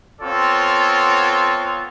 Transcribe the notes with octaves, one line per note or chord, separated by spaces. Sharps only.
B3 C4 F4 A4 C#5